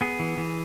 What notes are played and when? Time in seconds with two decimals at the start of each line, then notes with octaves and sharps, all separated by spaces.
0.01 B3 G#4
0.19 E3
0.38 E3